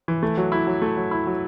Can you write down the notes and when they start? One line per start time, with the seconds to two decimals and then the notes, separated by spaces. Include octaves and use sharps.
0.08 E3
0.23 A3
0.37 F#3
0.52 E4
0.67 F#3
0.82 A3
0.97 F#3
1.11 E4
1.27 F#3